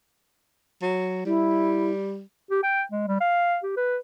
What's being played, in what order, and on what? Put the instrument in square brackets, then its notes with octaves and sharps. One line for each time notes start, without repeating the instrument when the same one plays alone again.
[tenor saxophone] F#3
[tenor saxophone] G3 [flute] E4
[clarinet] G4
G5
G#3
G3
F5
G4
B4